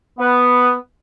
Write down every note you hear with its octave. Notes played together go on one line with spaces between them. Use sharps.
B3